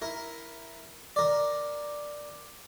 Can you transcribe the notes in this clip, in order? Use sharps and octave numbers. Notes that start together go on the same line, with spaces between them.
E4 A#4
A#4 D5